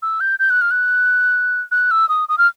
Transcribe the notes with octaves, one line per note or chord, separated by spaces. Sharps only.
E6
G6
G6
F#6
F6
F#6
F#6
E6
D#6
D#6
F6